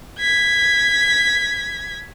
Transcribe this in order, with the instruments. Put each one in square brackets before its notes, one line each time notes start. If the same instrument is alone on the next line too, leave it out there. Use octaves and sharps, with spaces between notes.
[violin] G#6 B6